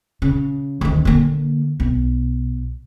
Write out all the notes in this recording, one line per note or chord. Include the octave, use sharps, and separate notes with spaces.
C#3
D2 D#3
D3 A#3
B1